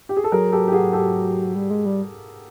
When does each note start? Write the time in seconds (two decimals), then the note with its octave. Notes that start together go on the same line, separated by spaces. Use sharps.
0.09 G4
0.17 G#4
0.24 A4
0.32 F#3 G#4 A#4
0.52 G4 A4
0.68 G4
0.73 F#4 G#4
0.93 G4 A4
1.55 G3
1.70 G#3
1.86 G3